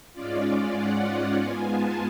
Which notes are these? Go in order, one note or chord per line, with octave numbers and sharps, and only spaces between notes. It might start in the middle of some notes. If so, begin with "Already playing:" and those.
G#2 G#3 C#4 F4 D5
F#5
G#2 G#3 B3 F4 G#5
A5